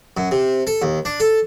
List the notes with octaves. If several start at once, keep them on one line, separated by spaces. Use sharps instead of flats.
F#2
C3
A4
D#2
D4
A4